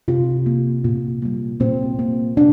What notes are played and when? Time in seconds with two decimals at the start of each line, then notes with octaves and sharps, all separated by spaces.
0.08 C3 F4
0.46 A#3
0.84 A#2
1.22 G3 A#3
1.60 A#2 C4
1.99 A#3
2.37 C3 D4